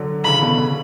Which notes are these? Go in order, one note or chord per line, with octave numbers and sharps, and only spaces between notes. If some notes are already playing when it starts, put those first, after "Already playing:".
Already playing: D3 F#3
C#3 E3 B5
B2 D3
C#3